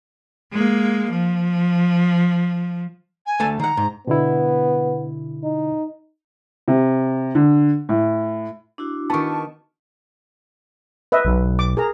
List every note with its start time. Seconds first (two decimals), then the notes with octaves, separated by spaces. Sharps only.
0.52 G#3 A#3
1.10 F3
3.26 G#5
3.40 D2 A3 A5
3.60 D#3 F#5 A#5
3.77 G#2
4.07 B2 D3 B3 E4
5.43 D#4
6.68 C3
7.35 D3
7.89 A2
8.78 D4 E4 F#4
9.10 D#3 B3 A5 C#6
11.12 B4 D#5 E5
11.25 B1
11.59 D6
11.77 G#4 A#4 A#5